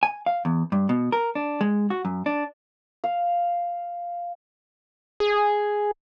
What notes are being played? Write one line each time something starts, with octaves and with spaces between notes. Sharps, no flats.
G#5
F5
E2
G2
B2
A#4
D4
G#3
F#4
F#2
D4
F5
G#4